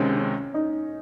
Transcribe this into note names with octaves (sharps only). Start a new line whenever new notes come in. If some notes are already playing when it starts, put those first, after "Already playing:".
Already playing: C#2 C3 D#3 G#3 C4 C#4
C#4
D#4